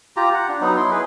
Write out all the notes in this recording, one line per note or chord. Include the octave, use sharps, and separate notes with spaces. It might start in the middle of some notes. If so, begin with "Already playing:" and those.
F4 G4 A#5
F#5
D4
F#3 B3 D#4
E4 C6
G#4 B4